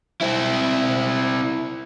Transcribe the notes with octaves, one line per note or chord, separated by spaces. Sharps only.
C4 E4